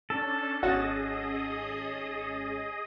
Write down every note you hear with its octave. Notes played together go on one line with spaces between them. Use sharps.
C#4 D4 A4 A5
G#1 C#4 F#4 G#4 D#5 D#6 A6